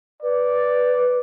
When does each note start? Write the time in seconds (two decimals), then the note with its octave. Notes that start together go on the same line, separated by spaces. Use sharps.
0.23 B4 D5